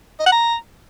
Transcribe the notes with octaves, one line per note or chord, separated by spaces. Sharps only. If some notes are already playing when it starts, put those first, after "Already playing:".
D#5
F#5
A#5